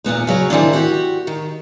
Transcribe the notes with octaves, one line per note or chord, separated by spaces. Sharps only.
E2 A#2 B3 D#4
C#3 F#3 C#5 F#5
D#3 E3 C4 D4
F#4 G4
D#3